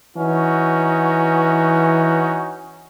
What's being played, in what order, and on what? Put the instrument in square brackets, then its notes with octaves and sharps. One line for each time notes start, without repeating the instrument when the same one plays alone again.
[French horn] E3 [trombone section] C#4 D#4 F#4